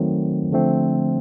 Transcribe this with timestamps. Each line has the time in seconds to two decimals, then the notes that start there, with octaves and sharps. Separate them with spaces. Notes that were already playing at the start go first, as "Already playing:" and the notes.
Already playing: D#3 F#3 A3 C4
0.52 D3 F3 A3 C4